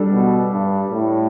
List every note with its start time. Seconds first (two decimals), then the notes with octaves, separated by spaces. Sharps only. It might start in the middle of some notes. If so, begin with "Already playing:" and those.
Already playing: G3 D4 A4
0.11 B2
0.52 G2
0.91 A2